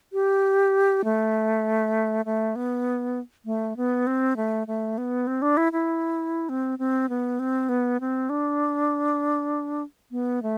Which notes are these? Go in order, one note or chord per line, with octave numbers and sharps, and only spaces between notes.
G4
A3
A3
B3
A3
B3
C4
A3
A3
B3
C4
D4
E4
E4
C4
C4
B3
C4
B3
C4
D4
B3
A3